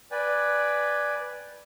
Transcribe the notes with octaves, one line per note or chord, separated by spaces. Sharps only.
B4 D5 G5 G#5